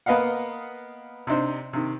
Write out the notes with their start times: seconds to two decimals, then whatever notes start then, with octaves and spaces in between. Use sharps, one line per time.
0.06 A#3 B3 B4 D#5 F5 F#5
1.27 C3 D4 D#4 C5
1.73 C3 D#3